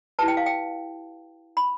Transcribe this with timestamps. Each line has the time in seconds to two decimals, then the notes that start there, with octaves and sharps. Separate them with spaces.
0.19 E4 G4 B4 A5
0.28 G5
0.37 F5
0.46 G5
1.57 B5